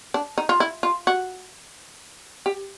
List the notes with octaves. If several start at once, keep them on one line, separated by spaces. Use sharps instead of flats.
D4
D#4
F4
E4
F4
F#4
G4